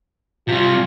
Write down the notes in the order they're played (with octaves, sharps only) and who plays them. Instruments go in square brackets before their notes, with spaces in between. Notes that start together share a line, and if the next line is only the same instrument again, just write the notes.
[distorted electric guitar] C3 G3 [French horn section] F4